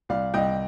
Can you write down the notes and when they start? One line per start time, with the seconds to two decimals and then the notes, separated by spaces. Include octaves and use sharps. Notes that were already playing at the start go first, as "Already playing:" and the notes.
0.09 C2 D5 F5
0.34 C2 D#5 G5